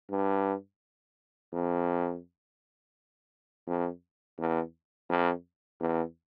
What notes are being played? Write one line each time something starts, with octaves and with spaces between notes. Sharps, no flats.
G2
F2
F2
E2
F2
E2